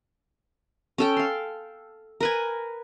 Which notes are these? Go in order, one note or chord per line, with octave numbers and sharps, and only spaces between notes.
C#4 A4 G5
F5 C6
A#4 B4 G#5